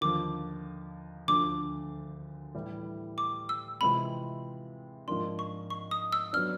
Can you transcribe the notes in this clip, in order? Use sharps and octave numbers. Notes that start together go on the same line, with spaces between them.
D#2 D3 F3 D6
D2 D3 F3 D6
A2 E3 G3
D6
E6
C3 E3 G#3 C4 F4 B5
G#2 F3 A#3 D4 C6
C#6
C#6
D#6
E6
F#3 B3 D4 F6